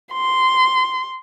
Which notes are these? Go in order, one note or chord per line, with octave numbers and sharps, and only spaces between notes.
C6